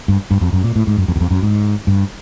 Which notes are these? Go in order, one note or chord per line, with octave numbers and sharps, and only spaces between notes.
G2
G2
F2
F#2
A#2
A2
G#2
F#2
F2
E2
F2
F#2
G#2
G2